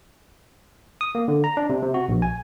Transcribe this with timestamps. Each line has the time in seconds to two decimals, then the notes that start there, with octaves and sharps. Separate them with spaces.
1.01 D#6
1.15 A#3
1.28 D3
1.44 A#5
1.57 D4
1.70 C3
1.83 C3
1.94 F#4
2.09 A#1
2.22 G#5